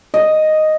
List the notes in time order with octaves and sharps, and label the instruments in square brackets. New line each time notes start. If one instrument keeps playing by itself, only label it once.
[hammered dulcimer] D#5